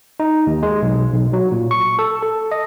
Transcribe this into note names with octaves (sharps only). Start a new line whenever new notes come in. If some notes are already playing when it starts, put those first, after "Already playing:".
D#4
D#2
G#3
B1
B1
F#3
A#2
C#6
A4
A4
D#5